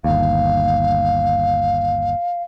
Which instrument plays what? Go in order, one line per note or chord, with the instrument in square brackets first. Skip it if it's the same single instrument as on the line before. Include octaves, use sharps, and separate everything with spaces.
[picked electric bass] G1 D#2 [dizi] F5